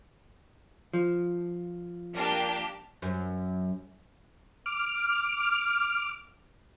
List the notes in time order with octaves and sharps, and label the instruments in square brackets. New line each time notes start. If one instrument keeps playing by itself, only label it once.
[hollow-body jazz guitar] F3
[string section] A#3 D4 G4
[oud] F#2
[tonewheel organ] D6 F6